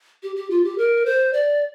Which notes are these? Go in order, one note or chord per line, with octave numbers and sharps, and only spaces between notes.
G4
G4
F4
G4
A#4
C5
D5